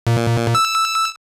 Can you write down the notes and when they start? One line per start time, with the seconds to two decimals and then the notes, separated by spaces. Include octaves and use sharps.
0.07 A#2
0.55 E6